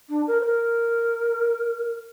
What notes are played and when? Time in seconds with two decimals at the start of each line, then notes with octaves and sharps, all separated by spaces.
0.09 D4
0.27 A#4
0.41 C5
0.45 A#4